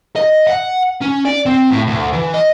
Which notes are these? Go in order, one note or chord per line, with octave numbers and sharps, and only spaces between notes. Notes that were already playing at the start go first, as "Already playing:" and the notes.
D#5
F#5
C#4
D5
C4
A2
D2
E3
D#5